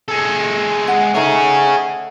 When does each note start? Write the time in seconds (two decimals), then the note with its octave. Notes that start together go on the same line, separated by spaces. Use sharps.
0.08 G#3 A4
0.88 F#5
1.15 A3 D#4 G#4 C#5